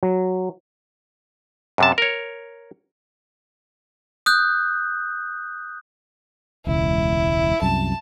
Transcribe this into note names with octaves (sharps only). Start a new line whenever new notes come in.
F#3
F#2 C3 A5
A#4 C#5
D#6 F#6 G6
E1 C#2 E4
C2 F#2 A5